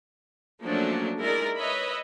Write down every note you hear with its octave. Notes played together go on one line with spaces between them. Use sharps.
F3 F#3 A3 A#3 C#4 D4
G#3 D#4 E4 A#4 D5
B4 C#5 D#5 E5 B5